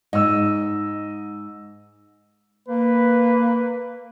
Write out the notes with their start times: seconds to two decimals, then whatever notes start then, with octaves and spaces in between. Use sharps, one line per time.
0.13 G#2 D#5 E6
2.68 A#3 B4